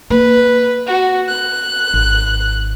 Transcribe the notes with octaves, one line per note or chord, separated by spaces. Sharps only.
A#3 B4
F#4
F#6
G#1